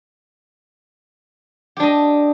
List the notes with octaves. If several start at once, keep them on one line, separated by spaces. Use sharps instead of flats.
D4 G4 D#5